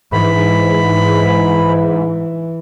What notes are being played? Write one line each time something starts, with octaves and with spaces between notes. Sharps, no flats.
G#2 E3 B5